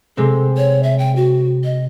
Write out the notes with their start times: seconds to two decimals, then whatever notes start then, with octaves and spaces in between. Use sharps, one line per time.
0.17 C3 G#3 C4 A4
0.57 C#5
0.83 E5
0.98 G5
1.16 F#4
1.64 D#5